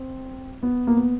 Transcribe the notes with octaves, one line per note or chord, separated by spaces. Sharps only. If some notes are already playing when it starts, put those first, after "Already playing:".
Already playing: C4
B3
A#3
B3